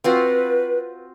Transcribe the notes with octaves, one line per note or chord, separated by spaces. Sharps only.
C4 F4 F#4 B4